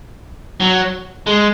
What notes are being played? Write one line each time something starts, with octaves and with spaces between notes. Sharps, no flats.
F#3
G#3